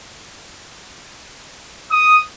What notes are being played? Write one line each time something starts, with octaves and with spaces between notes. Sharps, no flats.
D#6